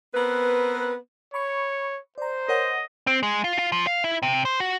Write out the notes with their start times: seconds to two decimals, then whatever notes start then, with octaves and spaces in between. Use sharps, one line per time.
0.14 B3 C4 A#4 B4
1.34 C#5 B5 C#6 C#7
2.18 C5 D5 A#5
2.49 A#4 C#5 D#5 F#5
3.07 C4
3.23 G#3
3.44 F4
3.59 F4
3.72 F3
3.87 F5
4.04 E4
4.23 C3
4.45 C5
4.60 F#4